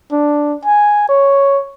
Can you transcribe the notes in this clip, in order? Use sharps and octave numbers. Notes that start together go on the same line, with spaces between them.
D4
G#5
C#5